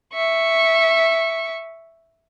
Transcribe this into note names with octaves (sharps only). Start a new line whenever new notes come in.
E5 C#6